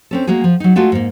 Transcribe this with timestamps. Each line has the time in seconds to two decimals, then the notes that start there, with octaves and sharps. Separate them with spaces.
0.11 C4 C#4 A4
0.27 G#3 A#3 F#4 G#4
0.44 F3
0.60 F#3 D#4
0.76 G#3 A3 D4 F4 F#4 A4
0.92 G#2 A#3